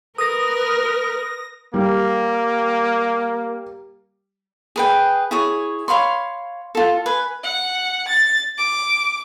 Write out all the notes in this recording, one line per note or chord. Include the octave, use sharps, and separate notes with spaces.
A#4 B4 D#6 A#6
G3 A#3
G#4 B4 G5
E4 G#4 C#5
C#5 F5 B5 C6
F4 A4
B4 G#5
F#5
A6
D6